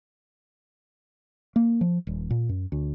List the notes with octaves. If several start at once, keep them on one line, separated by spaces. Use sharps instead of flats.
A#3
F3
D#1
A#2
F#2
D2